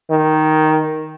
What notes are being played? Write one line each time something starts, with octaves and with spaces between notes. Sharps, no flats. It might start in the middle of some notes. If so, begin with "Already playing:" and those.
D#3